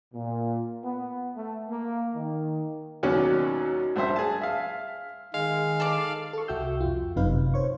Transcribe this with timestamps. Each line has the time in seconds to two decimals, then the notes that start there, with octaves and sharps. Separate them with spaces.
0.13 A#2
0.83 B3
1.36 A3
1.68 A#3
2.14 D#3
3.03 D#2 B2 F#3 C#4 D5
3.96 A#1 G2 C5 E5
4.16 G#4 A5
4.41 E5 F5
5.34 D#3 G#3 F5
5.80 A4 D5
6.33 A4 C#6
6.48 C2 F#4 E5 G5 E6 G6
6.81 F2 F4
7.16 G1 F#2 C3 D#4 B4 F5
7.54 C5 C#5 C#6